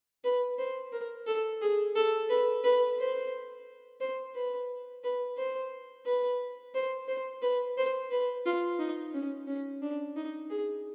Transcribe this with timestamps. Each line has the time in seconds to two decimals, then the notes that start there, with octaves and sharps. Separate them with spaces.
0.24 B4
0.58 C5
0.92 A#4
1.27 A4
1.61 G#4
1.95 A4
2.29 B4
2.64 B4
2.98 C5
4.00 C5
4.35 B4
5.04 B4
5.37 C5
6.05 B4
6.74 C5
7.08 C5
7.42 B4
7.77 C5
8.11 B4
8.46 F4
8.79 D#4
9.14 C#4
9.47 C#4
9.82 D4
10.16 D#4
10.50 G#4